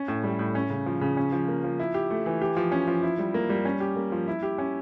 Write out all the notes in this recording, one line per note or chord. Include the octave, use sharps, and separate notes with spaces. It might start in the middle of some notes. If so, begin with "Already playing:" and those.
Already playing: C#4
A2
G3
A2
C#4
C#3
F3
C#3
C#4
F3
A#3
F3
E4
G4
A3
E3
G4
F3
C#4
F3
E4
G3
A#3
G3
C#4
G4
A#3
F3
E4
G4
C#4